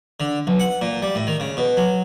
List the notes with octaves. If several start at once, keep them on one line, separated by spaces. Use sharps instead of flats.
D3
B1
F#5
A#2
G3
A2
D#3
C#3
B2
F#3